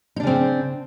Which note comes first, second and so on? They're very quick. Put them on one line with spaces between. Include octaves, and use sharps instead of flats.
D#4 D4 C#3 C4